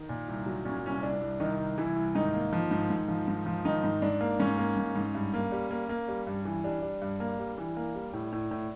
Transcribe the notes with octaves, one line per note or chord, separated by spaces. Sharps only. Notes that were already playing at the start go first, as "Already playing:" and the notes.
Already playing: D#3 D#4
A#2
C2
F#3
A#2 C#4
C2 C#4
C2 D4
C2
C2 D#3 D#4
C2
C2 E3 E4
C2
G#2 D#3 D#4
A#3
F3
G#2
G#2
F3
G#2
F3
G#2 D#3 D#4
G#2
G#2 D4
A#3
G#2 C#4
A#3
G#2
G#2
G2
A#3
G3
A#3
A#3
G3
G2
E3
G3 D4
G3
G2
A#3
G3
E3
A#3
G3
A2
A2
A2